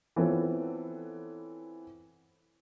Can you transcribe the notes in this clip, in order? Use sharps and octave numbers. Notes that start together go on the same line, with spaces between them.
E3 B3 C4 F4 A4 C#5